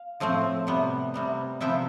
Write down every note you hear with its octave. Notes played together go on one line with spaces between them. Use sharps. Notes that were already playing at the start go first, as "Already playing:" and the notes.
Already playing: F5
A2 F3 A3 C4
C3 G3 B3
C3 G3 B3
C3 F3 B3 E5 G5